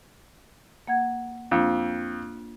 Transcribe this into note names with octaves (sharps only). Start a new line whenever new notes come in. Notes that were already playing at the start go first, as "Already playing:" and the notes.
A#3 F#5 G#6
F2 A#3 D4 F4